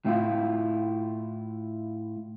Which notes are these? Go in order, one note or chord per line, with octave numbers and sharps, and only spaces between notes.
A2 E4 F4